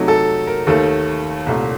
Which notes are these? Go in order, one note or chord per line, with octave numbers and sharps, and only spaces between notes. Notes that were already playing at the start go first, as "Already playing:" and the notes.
Already playing: C3 F#3 A3 D#4
A4
A#4
D#2 D#3 A3 A4
C2 A#2 A3